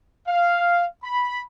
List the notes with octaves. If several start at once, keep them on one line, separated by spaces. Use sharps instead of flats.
F5
B5